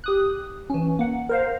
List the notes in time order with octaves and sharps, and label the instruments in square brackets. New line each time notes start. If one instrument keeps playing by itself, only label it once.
[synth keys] G4 D#6 F#6
E3 C#4
A#3 F#5
A#4 C5 F5